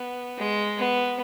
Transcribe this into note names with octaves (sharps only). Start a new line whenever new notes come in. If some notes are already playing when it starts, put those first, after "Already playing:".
Already playing: B3
G#3
B3